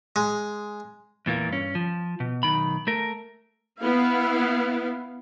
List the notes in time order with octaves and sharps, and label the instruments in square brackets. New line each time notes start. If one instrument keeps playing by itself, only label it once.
[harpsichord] G#3
[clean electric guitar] E2 A#2 E3 A#3
G2 C#4
F3
B2
B1 D#3 B5
A3 A#4
[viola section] B3 E4 F5